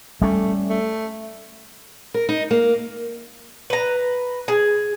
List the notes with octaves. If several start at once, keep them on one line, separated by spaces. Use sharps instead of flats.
G3 A3 C#4
A3
A#4
D#4
A#3
B4 A#5
G#4